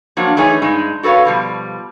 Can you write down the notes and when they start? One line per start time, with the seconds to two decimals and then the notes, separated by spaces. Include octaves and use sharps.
0.17 F3 F#3 A#3 D4
0.37 E3 A3 D#4 G#4 C#5
0.62 G2 G#3 D#4
1.03 F#4 A4 B4 C#5 F5
1.25 B2 F3 G3